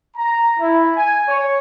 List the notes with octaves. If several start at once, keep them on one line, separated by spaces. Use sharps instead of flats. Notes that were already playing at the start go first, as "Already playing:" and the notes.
A#5
E4
G#5
C#5